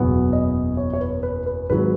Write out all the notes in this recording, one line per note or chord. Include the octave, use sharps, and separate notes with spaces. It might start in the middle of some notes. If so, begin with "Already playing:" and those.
Already playing: F#1 E2 B2 F#3 B3 F#5
D#5
C#5
C#5
B4
B4
B4
G#1 G#2 F#3 B4